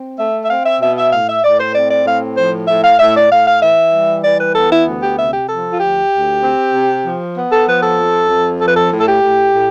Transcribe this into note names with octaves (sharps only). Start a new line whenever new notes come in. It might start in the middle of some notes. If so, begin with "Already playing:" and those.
Already playing: C4
A3 E5
E5
C4 F5
E5
B2 E5
E5
A2 F5
E5
A2 D5
C5
C4 D5
D5
A2 F5
F3 C5
A2 E5
F5
A2 E5
D5
A2 F5
F5
E3 E5
G3
E3 D5
B4
B3 A4
E4
D2
G4
C3 E5
G4
F3 A4
F4
D2 G4
D2
C4
C3
F3
B3
A4
F3 B4
A4
F2
F2
F3 A4
B4
A4
A2
A4
G4
A2
A2